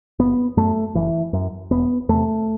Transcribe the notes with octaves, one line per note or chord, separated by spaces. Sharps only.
F#1 B3
F#2 A3
F#1 E3
F#2
E1 B3
E2 C3 A3